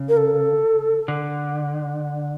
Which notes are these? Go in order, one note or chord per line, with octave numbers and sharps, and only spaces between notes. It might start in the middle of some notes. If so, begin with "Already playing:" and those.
Already playing: C#3
A#4
A4
D3